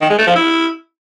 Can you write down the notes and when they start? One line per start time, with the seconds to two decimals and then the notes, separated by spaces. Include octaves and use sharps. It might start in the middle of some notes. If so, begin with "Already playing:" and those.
0.01 D#3
0.10 G#3
0.18 A3
0.27 F3
0.36 E4